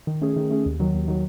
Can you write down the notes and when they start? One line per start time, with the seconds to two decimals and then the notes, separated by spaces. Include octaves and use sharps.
0.07 D#3
0.22 A3 C#4 G#4
0.36 D#3
0.51 A3 C#4 G#4
0.66 D#2
0.80 D#3 F#3
0.95 D#2
1.08 D#3 F#3